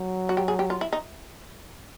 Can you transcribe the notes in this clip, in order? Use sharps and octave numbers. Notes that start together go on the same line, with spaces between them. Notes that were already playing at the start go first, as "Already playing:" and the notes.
Already playing: F#3
F#4
G4
G#4
G4
F4
E4
D#4